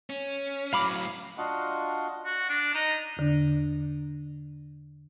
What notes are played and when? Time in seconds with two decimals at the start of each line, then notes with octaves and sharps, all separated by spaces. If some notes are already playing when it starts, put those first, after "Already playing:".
0.10 C#4
0.73 A2 F#3 F5 B5 D6
0.96 F5
1.38 D4 F4 F#4 D#5 F5 F#5
2.25 F#4
2.49 D4
2.75 D#4
3.17 E2 D3 D4